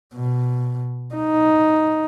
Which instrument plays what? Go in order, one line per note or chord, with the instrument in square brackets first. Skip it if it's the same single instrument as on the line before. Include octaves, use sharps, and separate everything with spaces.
[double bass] B2
D#4